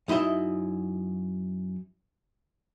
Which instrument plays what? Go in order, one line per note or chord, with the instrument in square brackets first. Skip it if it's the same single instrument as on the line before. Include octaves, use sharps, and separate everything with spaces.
[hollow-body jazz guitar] F#2 D#4 E4 D#5 E5